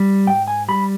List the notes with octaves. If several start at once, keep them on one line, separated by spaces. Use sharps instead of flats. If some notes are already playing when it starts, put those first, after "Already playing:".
Already playing: G3
G#2 G5
G#5
G3 B5